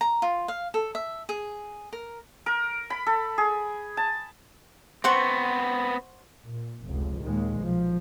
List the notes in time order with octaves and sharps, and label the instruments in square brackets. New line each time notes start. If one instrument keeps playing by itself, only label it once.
[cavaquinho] A#5
F4
F5
A4
E5
G#4
A#4
[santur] A#4
B5
A4
G#4
A5
[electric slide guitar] B3 C4 [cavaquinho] C5 F#5 C#6
[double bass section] A#2
F1 C#2
D#2 A#2 D#3 G#3
B1 F3